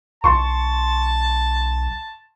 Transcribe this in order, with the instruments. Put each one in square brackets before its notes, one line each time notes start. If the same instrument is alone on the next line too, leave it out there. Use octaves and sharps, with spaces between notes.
[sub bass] B1 [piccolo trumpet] A5 [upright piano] C6 C#6